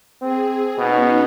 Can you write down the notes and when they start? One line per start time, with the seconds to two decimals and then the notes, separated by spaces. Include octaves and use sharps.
0.22 C4 G#4
0.78 B2 B3 C#4 D#4